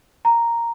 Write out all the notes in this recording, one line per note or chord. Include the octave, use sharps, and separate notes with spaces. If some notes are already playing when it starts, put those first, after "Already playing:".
A#5